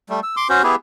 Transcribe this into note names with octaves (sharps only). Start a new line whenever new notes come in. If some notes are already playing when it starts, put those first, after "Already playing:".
G3 A3
E6
C6 D6
C#4 F#4 C5
B3 E4 G4 G#4